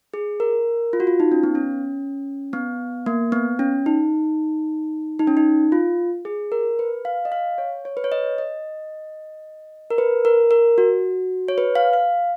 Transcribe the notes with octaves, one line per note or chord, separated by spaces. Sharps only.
G#4
A#4
F4
F#4
F4
D#4
C#4
B3
C#4
B3
A#3
B3
C#4
D#4
D#4
C#4
D#4
F4
G#4
A#4
B4
F5
D#5
F5
C#5
C#5
B4
C#5
D#5
D#5
A#4
B4
A#4
A#4
F#4
C#5
B4
F5
F5